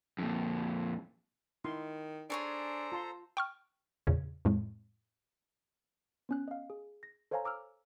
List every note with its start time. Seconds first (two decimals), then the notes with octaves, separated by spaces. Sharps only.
0.19 F2 A#2
1.65 D#3 D#4 E4 C6
2.30 D4 G#4 A4 C5 C#5 G#5 A#5
2.92 F4 A5 C6
3.37 G5 C#6 F6
4.07 E2 A#2 C#3
4.45 F2 A2 G#3
6.29 B3 C#4 F#6
6.48 D#5 F5
6.70 G#4
7.03 A#6
7.31 A4 C5 C#5 F5 G#5 A#5
7.45 A#5 D6 E6 F6